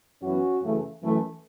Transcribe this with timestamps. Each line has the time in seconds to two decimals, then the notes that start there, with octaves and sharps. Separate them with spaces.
0.22 F#2 E3 B3 C#4 F#4
0.62 F#2 C#3 E3 A3
1.03 F#2 E3 A3